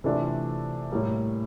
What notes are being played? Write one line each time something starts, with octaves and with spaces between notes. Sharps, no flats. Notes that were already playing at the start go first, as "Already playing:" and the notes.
C3 E3 A3 D4 F4
A2 G3 A#3